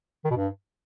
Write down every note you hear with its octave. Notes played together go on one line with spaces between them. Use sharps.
D#3
B2
G2